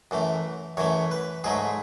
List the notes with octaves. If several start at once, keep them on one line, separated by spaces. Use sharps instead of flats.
F#2 E3 A3
F#2 E3 A3 C#5
B4
G#2 F#3 A3 G#4